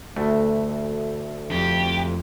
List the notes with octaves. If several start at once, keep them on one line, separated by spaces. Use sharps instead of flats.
D2 A3
F2 G4